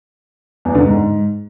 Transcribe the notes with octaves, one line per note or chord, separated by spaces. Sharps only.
E2
D3
G#2